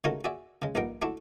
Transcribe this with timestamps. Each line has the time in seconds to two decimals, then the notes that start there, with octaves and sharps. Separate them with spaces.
0.04 C#3 G#3 A3 D#4 F#4 A#4
0.24 F#4 G#4 D5 E5
0.62 C#3 G#3
0.75 A#1 G2 D#4 A#4 F#5 G5
1.02 A3 D4 E4 F#4